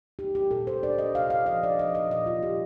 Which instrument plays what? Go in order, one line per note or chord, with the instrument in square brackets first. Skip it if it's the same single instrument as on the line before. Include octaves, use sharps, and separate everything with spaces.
[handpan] D#4 G4
G4
A#2 A4
C5
D4 D5
D#5
C3 F5
F5
F3 D#5
D5
F3 D#5
D#5
A#2 D#5
F4
A#2 G4